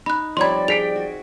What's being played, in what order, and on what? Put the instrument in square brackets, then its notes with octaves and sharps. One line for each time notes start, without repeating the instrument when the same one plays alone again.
[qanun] D#4 [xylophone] B5 F#6
[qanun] F3 G3 C4 [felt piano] C#5 B5 [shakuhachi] D5 [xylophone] C6 G#6
[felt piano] G#4 B6 D7 [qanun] G5 [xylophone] F7
[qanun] F#4